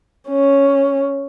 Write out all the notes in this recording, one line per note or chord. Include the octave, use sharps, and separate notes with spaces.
C#4